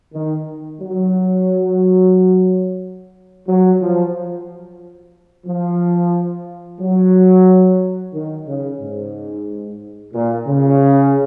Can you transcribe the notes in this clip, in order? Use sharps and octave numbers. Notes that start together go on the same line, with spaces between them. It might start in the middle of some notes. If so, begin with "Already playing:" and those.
D#3
F#3
F#3
F3
F3
F#3
D#3
C#3
G#2
A#2
C#3